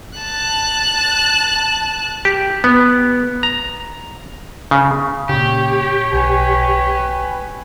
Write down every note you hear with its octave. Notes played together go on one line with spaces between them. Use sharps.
A5 F#6
G4
B3
A#5
C#3
A#2 C#3 G4 C#5
B1 B4 G5 G#5